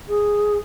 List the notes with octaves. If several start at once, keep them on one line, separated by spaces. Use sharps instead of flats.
G#4